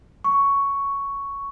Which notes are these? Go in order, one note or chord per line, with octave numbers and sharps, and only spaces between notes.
C#6